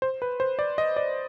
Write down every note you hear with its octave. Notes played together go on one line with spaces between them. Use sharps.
C5
B4
C5
D5
D#5
D5